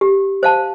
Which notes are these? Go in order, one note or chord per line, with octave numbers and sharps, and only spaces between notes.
G4
C5 F5 A5